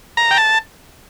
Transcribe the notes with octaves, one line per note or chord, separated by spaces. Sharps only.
A#5
G5
A5